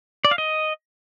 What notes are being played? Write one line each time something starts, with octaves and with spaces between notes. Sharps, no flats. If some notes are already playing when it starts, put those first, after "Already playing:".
D5
F5
D#5